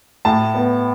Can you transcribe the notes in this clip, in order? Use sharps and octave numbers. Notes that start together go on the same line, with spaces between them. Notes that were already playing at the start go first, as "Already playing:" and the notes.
A2 A5
B3